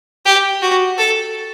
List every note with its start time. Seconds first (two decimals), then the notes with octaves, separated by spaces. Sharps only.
0.25 G4
0.62 F#4
0.98 A4